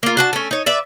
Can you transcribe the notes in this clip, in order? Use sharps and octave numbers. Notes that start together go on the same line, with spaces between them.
A#3 F4
D4 F#4 A5
A3 C#4
D#4 C#5
B4 D5 E5